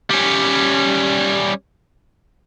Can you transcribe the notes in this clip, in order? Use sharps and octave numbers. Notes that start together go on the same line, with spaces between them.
G3 C#4